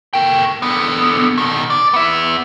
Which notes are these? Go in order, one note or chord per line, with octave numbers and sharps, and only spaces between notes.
A3 G5
D3 B3
B2 D#3
D5
B3 E5